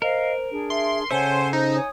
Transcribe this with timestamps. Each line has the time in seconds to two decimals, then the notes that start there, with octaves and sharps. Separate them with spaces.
0.02 A#4 C5 D#5 F5
0.51 D4 G#4
0.70 E5 C6
1.11 C#3 A4 C5 C#5 E5 F#5 G#5
1.53 D#4 C5
1.74 C#5 G#5 D#6